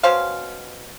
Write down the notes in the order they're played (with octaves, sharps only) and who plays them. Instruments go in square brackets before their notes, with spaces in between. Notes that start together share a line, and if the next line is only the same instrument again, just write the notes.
[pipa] B2 C#4 C5 F5